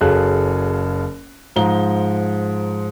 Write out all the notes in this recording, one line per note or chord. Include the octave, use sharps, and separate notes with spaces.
F#1 F#3 G#4 A4 F5 F#6
G#2 F3 A#5 G7